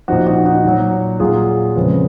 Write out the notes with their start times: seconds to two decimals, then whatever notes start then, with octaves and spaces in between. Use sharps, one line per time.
0.08 A#2 F3 D#4 F#4
0.27 D#4 F#4
0.45 D#4 F#4
0.64 A#2 F#3
1.20 A#2 F#3 F4 G#4
1.76 F2 C#3 F3 G#3 B3